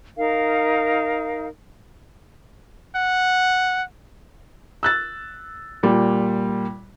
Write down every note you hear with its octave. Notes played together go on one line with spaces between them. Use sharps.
D#4 A#4 F5
F#5
E6 F#6 A6
A#2 G3